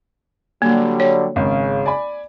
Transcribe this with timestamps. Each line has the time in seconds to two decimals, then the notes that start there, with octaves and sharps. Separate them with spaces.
0.62 D3 F#3 G3 A#3
1.00 C#5
1.36 G#1 C#3
1.86 D5 G#5 B5